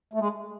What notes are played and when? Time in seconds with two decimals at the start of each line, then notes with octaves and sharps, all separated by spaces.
0.13 A3
0.20 G#3